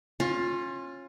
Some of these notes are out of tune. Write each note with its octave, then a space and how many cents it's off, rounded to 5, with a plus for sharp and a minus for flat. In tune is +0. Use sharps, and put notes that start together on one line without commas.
C#4 -20 F4 +15